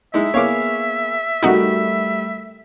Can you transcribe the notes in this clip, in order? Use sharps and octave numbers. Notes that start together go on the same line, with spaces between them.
G#3 D#4 E4 E5
A#3 B3 G#4 C#5 F5 D6
G3 A3 D#4 F#4 A#4